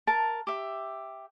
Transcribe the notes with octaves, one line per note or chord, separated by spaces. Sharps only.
A#4 A5
G4 E5